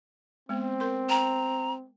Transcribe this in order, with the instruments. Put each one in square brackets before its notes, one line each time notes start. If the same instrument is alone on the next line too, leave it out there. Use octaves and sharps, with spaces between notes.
[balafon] G#3 B3 [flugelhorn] C4
[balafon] A#4 C6
[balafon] G5 [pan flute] A#5